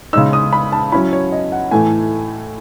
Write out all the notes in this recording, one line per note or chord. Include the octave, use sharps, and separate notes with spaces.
C#3 G#3 D#4 E6
D#6
B5
A5
F#3 C#4 E4 B5
C#5
D#5
F#5
A2 E3 A3 E4 G#5